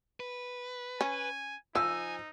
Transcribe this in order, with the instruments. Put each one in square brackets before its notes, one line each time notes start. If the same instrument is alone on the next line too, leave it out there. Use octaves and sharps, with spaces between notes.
[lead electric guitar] B4
[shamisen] C#4 [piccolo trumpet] G#5
[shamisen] F3 [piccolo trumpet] D#4 [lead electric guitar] G#5 [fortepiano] E6